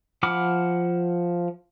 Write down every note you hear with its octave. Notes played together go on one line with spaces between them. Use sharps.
F3 F#5 B5 D6 F6